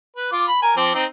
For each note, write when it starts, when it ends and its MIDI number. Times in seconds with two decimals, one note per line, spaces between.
0.17 0.28 71
0.32 0.47 65
0.32 0.47 86
0.48 0.60 83
0.63 0.74 70
0.63 0.74 80
0.77 0.94 53
0.77 0.94 60
0.77 0.94 86
0.95 1.05 60
0.95 1.05 63